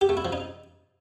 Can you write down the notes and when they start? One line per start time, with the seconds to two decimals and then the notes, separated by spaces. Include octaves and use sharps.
0.01 G4
0.09 A3
0.17 E4
0.25 F3
0.32 D#4